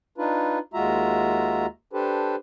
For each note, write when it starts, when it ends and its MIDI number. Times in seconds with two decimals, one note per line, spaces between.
0.18 0.59 62
0.18 0.59 63
0.18 0.59 65
0.18 0.59 71
0.74 1.66 39
0.74 1.66 56
0.74 1.66 65
0.74 1.66 66
0.74 1.66 76
0.74 1.66 82
1.93 2.36 62
1.93 2.36 67
1.93 2.36 69
1.93 2.36 71
1.93 2.36 72